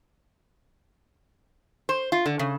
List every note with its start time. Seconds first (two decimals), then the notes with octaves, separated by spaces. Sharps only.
1.89 C5
2.12 F4
2.26 D3
2.39 C#3